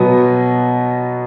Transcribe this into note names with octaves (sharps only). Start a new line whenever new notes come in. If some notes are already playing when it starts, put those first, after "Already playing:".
Already playing: B2 F#3 B3